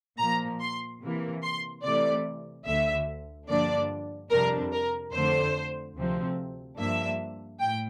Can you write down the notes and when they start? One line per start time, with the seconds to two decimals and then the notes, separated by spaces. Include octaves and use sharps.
0.19 A#2 F3 A#3 A#5
0.60 C6
1.01 C3 E3 A#3
1.43 C6
1.83 C3 E3 A3 D5
2.66 D2 D3 A3 E5
3.48 G2 D3 F3 A#3 D4 D5
4.30 F2 C3 G3 D4 A#4
4.72 A#4
5.12 F2 D3 A3 D4 C5
5.95 D2 C3 F3 C4
6.77 G2 F3 A#3 D4 E5
7.59 A2 G5